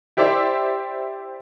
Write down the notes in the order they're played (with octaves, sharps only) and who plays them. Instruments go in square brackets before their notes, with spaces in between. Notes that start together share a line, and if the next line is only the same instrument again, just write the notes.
[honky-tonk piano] E4 G4 C5 D5 E5